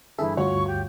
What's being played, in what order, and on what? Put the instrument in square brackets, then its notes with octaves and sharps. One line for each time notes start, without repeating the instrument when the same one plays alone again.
[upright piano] G1 E3 [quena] E4 [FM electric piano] G#4 A4 E5
[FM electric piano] D2 G2 F4 [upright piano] F#4 C#5 F#5 [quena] C#6
[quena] G4